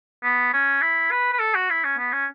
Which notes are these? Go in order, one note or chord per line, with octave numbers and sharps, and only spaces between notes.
B3
C#4
E4
B4
B4
A4
F#4
E4
C#4
B3
C#4